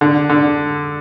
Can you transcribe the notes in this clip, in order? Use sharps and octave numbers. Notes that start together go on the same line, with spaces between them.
D3
D3